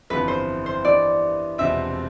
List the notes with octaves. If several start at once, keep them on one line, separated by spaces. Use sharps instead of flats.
G1 F2 E3 B3 F4 B4
C5
C5
G2 E3 B3 D5
E1 E2 C3 F3 C4 E5